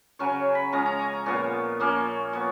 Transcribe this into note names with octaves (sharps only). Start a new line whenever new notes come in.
C#3 F#3 C#4 C#5
B5
F3 G#3 C#4 A#5
A#5
G#5
A#5
A#2 F3 B3 C#5
F3 A#3 C#4
F3 B3 C#5